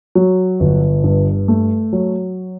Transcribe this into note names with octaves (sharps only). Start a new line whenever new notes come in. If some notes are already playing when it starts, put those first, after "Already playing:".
F#3
G1
G2
A3
F#3